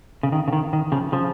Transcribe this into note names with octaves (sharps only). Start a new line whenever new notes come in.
C#3
D#3
C#3
D#3
D#3
C#3 F3
C#3 F3